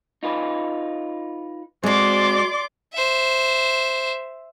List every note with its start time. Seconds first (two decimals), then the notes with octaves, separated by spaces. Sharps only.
0.23 D#4 F4 B4
1.84 G#3 C4 F#4 D5 C6 D6
2.93 C5 E5